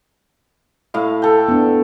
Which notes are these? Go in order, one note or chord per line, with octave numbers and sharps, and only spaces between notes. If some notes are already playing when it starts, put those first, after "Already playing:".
A2 F5
A4 G5
B3 D4